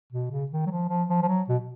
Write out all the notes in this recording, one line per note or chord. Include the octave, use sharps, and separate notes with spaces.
B2
C#3
D#3
F#3
F3
F3
F3
F3
F#3
B2